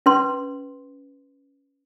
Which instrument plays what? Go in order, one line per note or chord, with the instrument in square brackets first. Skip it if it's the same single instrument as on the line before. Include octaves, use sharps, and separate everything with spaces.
[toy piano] C#4 B4 C6